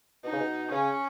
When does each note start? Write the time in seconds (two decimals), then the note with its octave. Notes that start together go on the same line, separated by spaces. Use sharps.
0.24 B2 D#4
0.32 C#3
0.40 B2
0.71 C#3 C#4